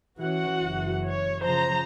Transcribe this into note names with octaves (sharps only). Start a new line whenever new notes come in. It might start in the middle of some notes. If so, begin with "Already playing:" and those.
E3 C#4 F#4 F#5
F#1 E3
C#5
C#3 F3 C5 A#5